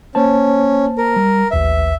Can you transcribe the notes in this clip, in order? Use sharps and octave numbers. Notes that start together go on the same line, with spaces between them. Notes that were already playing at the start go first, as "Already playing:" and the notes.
A#3 C#4 C5 A5
A#4
G3
A1 D#2 B4 E5